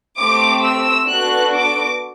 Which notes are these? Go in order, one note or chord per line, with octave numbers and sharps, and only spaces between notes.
A3 C4 G4 D6
E6
B3 D4 F#4 A4 F#6
D6